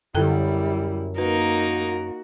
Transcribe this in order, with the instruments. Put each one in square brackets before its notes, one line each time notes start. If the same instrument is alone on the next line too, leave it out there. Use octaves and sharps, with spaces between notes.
[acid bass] F#2 [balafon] D3 A4 G5 [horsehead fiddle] G3 E4
[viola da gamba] A#3 D#4 A#4 [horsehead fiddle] F#4 [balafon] B4